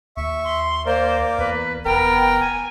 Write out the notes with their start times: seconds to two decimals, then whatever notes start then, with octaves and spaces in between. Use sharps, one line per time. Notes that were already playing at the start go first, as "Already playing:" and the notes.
0.17 D#2 E5 C#6
0.45 C6
0.86 A#3 A#4 C5 D5
1.38 E2 B4
1.85 F1 B3 A#4 G5
2.40 G#5